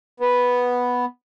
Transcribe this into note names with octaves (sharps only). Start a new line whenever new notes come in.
B3